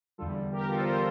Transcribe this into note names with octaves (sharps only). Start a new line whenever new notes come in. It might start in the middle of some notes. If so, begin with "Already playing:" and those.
E2 D3 G3 F4 A4
G4 A#4
F4 A4
C5
D3 G3 G4 A#4